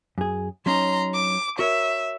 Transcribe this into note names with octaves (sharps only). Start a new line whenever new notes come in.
F#2 G#4
F#3 C#4 D#4 A#5 C6
D6
F#4 A#4 C#5 E5